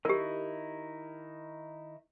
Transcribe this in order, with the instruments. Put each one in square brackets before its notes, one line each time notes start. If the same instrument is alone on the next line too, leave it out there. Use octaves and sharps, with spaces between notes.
[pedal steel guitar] D#3 D#4 E4 [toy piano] G4 A#4